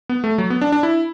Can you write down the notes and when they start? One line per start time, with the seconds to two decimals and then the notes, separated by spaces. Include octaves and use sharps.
0.09 B3
0.24 A3
0.38 F#3
0.50 B3
0.61 D4
0.72 D4
0.83 E4